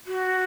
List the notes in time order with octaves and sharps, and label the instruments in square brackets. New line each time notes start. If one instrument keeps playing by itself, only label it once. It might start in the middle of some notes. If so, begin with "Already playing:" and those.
[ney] F#4